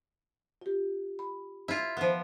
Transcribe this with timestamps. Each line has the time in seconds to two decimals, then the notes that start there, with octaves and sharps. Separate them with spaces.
0.61 F4 G4
1.19 B5
1.68 E4 F4
1.97 F3 B3